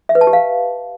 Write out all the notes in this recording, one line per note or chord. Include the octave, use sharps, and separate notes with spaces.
E5
B4
A5
G4
F5